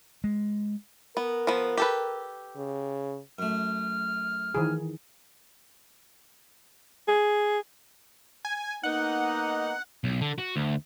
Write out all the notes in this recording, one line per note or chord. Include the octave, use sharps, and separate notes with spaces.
G#3
B3 A#4
F3 B3
G4 A4 B4
C#3
F#2 A3 F6
D#3 E3 G#4
G#4
G#5
A#3 B3 D#4 F#5
B1
D3
F#4
D2